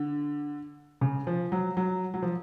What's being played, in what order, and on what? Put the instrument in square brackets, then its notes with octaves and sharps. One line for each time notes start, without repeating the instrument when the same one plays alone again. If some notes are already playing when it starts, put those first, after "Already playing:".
Already playing: [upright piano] D3
C#3
F3
F#3
F#3
F#3
F3